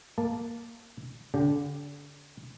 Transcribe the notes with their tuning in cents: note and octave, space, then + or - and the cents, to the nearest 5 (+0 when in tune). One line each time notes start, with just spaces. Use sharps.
A#3 +0 A5 +0
D3 -35 G4 +0